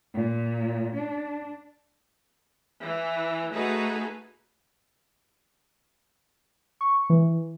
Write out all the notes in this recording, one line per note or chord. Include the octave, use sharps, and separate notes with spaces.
A#2
D4
E3
A3 D#4 F#4 G#4 A4 B4
C#6
E3